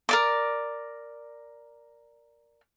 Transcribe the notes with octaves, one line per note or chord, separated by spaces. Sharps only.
A#4 D5 D6